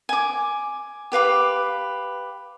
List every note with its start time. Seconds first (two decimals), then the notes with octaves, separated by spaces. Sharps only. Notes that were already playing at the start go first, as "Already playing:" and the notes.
0.09 G#5 D6
1.12 G4 B4 F5 D6